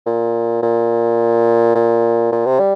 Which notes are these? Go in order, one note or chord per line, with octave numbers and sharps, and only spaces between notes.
A#2
A#2
A#2
A#2
C3
G3